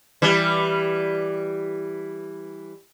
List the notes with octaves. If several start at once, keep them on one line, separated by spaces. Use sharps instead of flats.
E3 G3